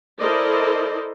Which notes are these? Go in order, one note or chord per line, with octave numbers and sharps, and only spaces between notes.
E4 A4 A#4 C5 D5 D#5